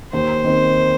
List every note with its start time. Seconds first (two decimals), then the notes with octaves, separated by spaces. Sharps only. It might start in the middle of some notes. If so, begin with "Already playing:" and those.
0.13 D#2 C5
0.44 D#3 C4